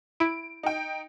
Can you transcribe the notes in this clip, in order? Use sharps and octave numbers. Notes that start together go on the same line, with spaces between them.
E4 D7
D#4 G5